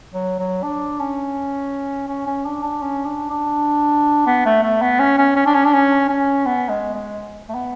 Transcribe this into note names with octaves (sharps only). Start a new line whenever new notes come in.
F#3
F#3
D4
C#4
C#4
C#4
D4
D4
C#4
D4
D4
B3
A3
A3
B3
C#4
C#4
C#4
D4
C#4
D4
C#4
C#4
B3
G#3
G#3
A3
B3